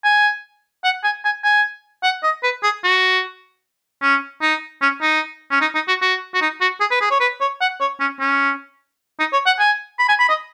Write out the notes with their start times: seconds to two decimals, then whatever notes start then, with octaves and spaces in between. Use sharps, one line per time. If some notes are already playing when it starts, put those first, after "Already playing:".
0.04 G#5
0.84 F#5
1.04 G#5
1.24 G#5
1.44 G#5
2.03 F#5
2.23 D#5
2.43 B4
2.63 G#4
2.83 F#4
4.02 C#4
4.42 D#4
4.82 C#4
5.02 D#4
5.51 C#4
5.61 D#4
5.75 D#4
5.88 F#4
6.02 F#4
6.34 F#4
6.41 D#4
6.61 F#4
6.80 G#4
6.91 B4
7.01 G#4
7.11 C#5
7.20 B4
7.41 C#5
7.61 F#5
7.80 C#5
8.00 C#4
8.20 C#4
9.20 D#4
9.33 C#5
9.46 F#5
9.59 G#5
9.99 B5
10.09 G#5
10.19 B5
10.29 D#5